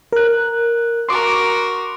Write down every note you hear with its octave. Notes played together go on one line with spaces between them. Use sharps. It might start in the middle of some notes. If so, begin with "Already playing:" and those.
A#4 F#6
F#4 A#4 C6 D6